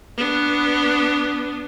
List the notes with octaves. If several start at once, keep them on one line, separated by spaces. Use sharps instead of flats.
B3 D4